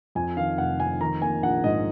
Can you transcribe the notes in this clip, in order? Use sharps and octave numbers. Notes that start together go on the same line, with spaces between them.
F2 G#5
D#3 F5
F1 F#5
F2 G#5
D#3 A#5
A#3 G#5
A#1 F#5
G#2 D#5